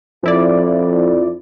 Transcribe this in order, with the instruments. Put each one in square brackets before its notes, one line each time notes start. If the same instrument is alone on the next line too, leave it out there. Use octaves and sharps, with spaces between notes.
[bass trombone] F2 [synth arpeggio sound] F3 E4 D5